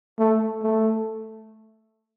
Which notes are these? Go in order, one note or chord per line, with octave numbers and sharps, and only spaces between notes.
A3
A3